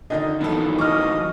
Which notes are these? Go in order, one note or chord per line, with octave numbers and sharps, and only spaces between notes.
D3 D#3 D#4 D#5
D#3 E3 F#3 B3 A4
D#5 C#6 D6 F6